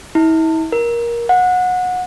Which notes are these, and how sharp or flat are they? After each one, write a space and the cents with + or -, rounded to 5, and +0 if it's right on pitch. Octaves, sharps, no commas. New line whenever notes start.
E4 -40
A#4 +15
F#5 -25